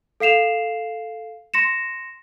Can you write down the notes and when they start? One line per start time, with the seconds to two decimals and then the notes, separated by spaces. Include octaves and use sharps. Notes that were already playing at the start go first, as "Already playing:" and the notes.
0.20 A4 F5 C7 E7 F7
1.54 C6 A#6 C#7 E7